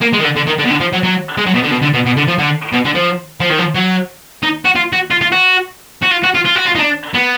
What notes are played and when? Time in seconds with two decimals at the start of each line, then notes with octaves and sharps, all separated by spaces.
0.02 A#3
0.13 G#3
0.19 D#3
0.24 D3
0.36 D3
0.47 D#3
0.59 D3
0.65 B2
0.70 D3
0.81 F3
0.93 F#3
1.03 F#3
1.38 G#3
1.47 F#3
1.55 B2
1.64 D3
1.71 B2
1.82 D3
1.94 B2
2.06 B2
2.17 D3
2.28 F3
2.39 D3
2.73 B2
2.85 D3
2.95 F3
3.40 F3
3.50 D#3
3.58 F3
3.75 F#3
4.43 D#4
4.65 F#4
4.76 F4
4.93 F#4
5.11 F4
5.21 F4
5.32 F#4
6.03 F#4
6.11 F4
6.24 F#4
6.35 F4
6.45 F4
6.56 F#4
6.66 F4
6.75 D#4
6.79 D4
7.14 B3